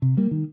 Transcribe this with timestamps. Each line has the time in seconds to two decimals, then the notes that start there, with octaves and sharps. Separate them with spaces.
0.02 C3
0.17 G3 A#3
0.31 D#3